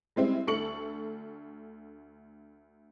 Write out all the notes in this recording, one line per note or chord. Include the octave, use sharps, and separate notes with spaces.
G3 G#3 C4 E4
D2 A4 C#6 C#7 F#7